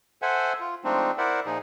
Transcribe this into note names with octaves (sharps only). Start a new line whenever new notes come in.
A4 C5 E5 F#5 G#5
F4
F3 G#3 A3 C4 D4 D#4
E4 A#4 C5 D5 E5 F#5
A#2 F3 D#4 G#4